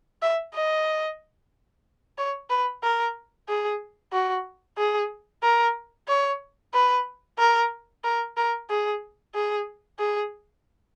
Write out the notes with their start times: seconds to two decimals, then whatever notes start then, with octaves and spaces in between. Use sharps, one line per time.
0.22 E5
0.54 D#5
2.18 C#5
2.50 B4
2.83 A#4
3.48 G#4
4.13 F#4
4.78 G#4
5.43 A#4
6.08 C#5
6.73 B4
7.39 A#4
8.04 A#4
8.37 A#4
8.69 G#4
9.35 G#4
9.99 G#4